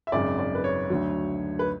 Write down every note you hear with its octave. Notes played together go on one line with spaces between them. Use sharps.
E5
G#1 F#2 C#3 D5
D5
B4
C#5
D2 D3 F#3
B4